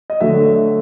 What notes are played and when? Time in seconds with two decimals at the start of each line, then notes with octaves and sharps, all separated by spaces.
0.10 D#5
0.21 D3 F#3 A3 E5